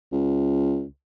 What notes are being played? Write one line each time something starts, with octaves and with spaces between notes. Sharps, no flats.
C#2